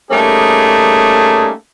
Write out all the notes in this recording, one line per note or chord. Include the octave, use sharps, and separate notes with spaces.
G3 A3 A#3 C#4 D#4 G#4